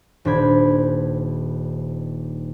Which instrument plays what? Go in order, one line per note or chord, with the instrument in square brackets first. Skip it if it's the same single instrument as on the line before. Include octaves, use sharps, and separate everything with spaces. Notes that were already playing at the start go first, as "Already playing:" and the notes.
[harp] D#1 D4 C5 B5 G#6